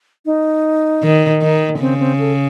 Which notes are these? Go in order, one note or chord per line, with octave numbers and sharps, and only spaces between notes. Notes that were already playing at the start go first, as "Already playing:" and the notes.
D#4
D#3
D#3
C#3 C4
C4
A4